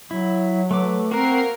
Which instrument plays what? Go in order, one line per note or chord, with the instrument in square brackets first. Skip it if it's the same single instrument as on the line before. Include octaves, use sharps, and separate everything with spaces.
[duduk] F#3 [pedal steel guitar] E4
[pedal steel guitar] A3 B4 D6
[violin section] A#3 A#4 C7 [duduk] C4 [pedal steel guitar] F#4 F#6